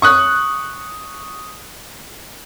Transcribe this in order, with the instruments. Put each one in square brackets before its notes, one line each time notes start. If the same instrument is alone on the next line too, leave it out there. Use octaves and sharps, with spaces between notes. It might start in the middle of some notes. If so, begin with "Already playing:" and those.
[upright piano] C#6 D#6 F#6